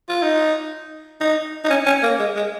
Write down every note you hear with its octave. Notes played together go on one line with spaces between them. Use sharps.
F4
D#4
D#4
D#4
C#4
C#4
A#3
G#3
G#3